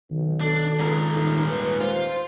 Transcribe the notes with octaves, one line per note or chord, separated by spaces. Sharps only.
B1 D#3
D4 A4
C#2 G#2 A#4
D#1 D#4
B4
F4 C5